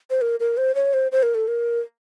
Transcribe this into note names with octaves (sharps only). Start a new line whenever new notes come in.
C5
A#4
A#4
C5
C#5
C5
C5
A#4
A4
A#4